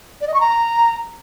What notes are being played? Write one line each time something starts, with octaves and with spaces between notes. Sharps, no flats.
D5
D#5
C#6
A#5